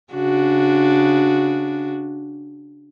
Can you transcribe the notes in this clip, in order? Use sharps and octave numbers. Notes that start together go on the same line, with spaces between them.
C#3 D4 F#4